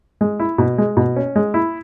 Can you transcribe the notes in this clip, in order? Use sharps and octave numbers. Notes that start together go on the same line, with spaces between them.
G#3
E4
B2
G#3
B2
C#4
G#3
E4